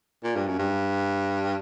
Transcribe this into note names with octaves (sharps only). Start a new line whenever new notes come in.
A#2
G2
F#2
G2